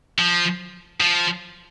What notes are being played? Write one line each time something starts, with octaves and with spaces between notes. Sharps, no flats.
F3
F3